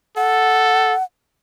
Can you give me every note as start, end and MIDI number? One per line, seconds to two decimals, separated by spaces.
0.17 0.94 69
0.17 1.03 78